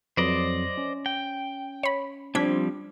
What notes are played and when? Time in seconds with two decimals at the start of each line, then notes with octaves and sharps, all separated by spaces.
0.17 F2 F#3 B4 C5 D5 D#5
0.78 C#4
1.06 G5
1.83 C#5 B5
2.35 F3 G3 C4 D4 G#6 B6